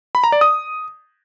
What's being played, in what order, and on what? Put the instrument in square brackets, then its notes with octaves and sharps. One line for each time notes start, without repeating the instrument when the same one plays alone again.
[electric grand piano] B5
A#5
D5
D#6